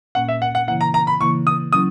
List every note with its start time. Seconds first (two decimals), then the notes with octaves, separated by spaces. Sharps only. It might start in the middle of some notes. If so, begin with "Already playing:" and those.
0.15 A#2 A#3 C#4 F#5
0.28 E5
0.42 F#5
0.55 F#5
0.67 C#3 E3 A#3 E4 F#5
0.81 A#5
0.94 A#5
1.07 B5
1.21 C#3 E3 A#3 E4 C#6
1.47 D#6
1.73 F#3 C#4 E4 D#6